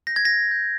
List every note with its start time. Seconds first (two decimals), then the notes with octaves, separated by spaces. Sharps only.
0.07 G6 A#6
0.16 G#6
0.25 A#6
0.51 G6